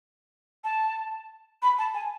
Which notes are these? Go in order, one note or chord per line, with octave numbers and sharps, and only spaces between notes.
A5
B5
A5
G#5